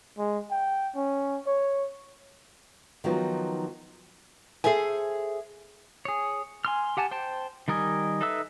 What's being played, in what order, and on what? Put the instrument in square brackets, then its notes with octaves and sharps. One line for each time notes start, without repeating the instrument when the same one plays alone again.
[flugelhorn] G#3
G5
C#4
C#5
[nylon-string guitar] D#3 F3 F#3 B3 D#4 F4
G#4 A4 C5 E5 G#5
[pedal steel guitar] G#4 C#5
G#5 C6 F6
G4 F#5 G#5 A5
C5 G5 A5
D#3 G3 A#4 D#5 G#5
D#4 A4 B4 E5 E6